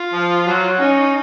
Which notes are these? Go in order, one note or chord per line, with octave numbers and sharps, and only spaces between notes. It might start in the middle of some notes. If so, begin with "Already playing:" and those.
Already playing: F4
F3
F#3
C#4 D#4